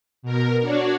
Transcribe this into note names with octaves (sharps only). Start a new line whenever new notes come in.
B2 A#4
D4 F#4 C#5 D5